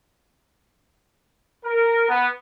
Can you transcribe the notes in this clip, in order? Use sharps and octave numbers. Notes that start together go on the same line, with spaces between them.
A#4
B3